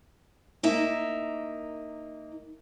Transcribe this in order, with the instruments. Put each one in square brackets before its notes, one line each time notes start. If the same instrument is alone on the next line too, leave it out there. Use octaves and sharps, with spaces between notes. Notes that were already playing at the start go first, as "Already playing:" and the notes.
[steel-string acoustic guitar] A#3 D#4 E5